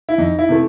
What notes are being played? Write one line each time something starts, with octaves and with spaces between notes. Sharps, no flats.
E4
F2 D#4
E4
C3 E3 A3